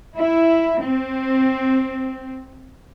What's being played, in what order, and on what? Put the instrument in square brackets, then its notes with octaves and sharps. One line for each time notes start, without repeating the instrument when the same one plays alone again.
[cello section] E4
C4